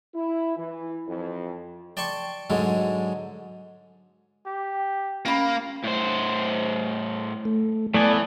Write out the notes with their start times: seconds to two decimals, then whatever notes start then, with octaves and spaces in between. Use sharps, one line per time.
0.14 E4
0.57 E3
1.08 F2
1.97 D5 G5 A5 C6 C#6
2.50 G#2 D3 F#3 G#3
4.46 G4
5.26 A#3 C#4 F4 B5
5.84 A2 C5
7.45 A3
7.94 E3 A3 B3 D5 G#5 A5